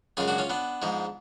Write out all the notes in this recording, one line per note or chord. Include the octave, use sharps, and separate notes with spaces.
F#2 C#3 G#3 F4 G#4
D4 F#4
C#4 F4
B3 D4
G#2 F3 G#3